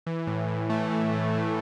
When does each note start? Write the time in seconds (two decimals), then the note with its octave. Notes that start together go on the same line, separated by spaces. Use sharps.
0.06 E3
0.27 A2
0.48 A2
0.70 A3
0.91 E3
1.12 A2
1.34 A2